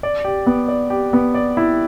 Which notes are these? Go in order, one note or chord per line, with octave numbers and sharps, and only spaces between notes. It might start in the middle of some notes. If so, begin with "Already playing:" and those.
D5
G4
B3
D5
G4
B3
D5
E4